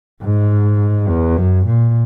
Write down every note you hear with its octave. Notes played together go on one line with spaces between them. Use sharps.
G#2
E2
F#2
A#2